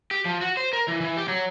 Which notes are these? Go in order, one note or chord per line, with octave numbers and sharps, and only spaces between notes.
G4
F3
F#4
C5
A#4
E3
E3
G4
F#3